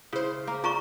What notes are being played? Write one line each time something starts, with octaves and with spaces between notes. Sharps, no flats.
C#3 E4 C5
A#3 A#4
F4 D5 A#5 C#6